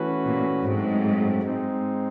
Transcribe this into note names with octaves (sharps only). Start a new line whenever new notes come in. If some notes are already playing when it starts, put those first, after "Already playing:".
Already playing: E3 A3 C#4 F#4 B4
A#2
G#2 F#3 A3 C4
G#3 C4 D#4